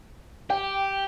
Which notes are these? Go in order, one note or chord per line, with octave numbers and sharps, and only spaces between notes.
G4 G5